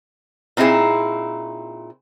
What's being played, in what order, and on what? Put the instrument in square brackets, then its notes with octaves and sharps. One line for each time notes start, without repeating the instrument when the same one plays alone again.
[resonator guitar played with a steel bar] A#2 C4 D#4 E4 G#4 C5